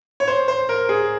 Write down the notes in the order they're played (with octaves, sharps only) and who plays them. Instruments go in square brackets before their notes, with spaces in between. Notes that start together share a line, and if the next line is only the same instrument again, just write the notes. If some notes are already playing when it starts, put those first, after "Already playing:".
[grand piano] C#5
C5
C5
A#4
G#4